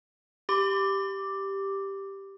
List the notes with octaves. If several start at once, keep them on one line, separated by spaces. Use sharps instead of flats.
G4 D6